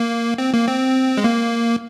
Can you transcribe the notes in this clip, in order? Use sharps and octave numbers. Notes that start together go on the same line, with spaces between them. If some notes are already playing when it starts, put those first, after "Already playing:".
Already playing: A#3
C4
A#3
C4
G#3
A#3